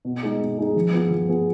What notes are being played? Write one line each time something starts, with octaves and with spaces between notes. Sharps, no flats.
B2
G#3 D#4 G#4
B2
G#3 D#4 G#4
F3
B3 F4 G#4
F3
B3 F4 G#4